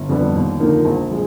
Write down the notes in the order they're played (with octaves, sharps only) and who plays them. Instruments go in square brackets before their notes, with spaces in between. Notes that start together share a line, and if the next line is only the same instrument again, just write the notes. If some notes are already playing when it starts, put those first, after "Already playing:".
Already playing: [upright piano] G1
F2 D3 G3 B3
D#2
D3 F3 A#3 D#4
A#1
F3 G#3